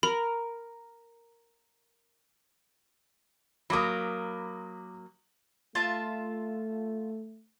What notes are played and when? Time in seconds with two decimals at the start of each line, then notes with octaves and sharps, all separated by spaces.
0.03 A#4 B5
3.70 F#3 A#3 B5 D6 D#6
5.75 A3 F4 E5 A5